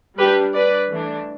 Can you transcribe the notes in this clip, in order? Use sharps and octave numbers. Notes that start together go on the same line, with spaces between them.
G3 D4 G4 B4
B4 D5
E3 A3 D4